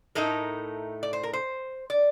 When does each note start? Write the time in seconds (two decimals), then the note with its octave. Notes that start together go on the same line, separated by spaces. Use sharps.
0.15 A2 A3 D#4 A#4
1.03 D5
1.13 C5
1.23 A#4
1.33 C5
1.90 D5